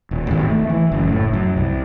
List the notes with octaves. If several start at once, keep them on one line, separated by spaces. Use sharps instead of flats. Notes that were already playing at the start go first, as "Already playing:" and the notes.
D#1
G#1
A3
E3
F#1
A2
F#2
C2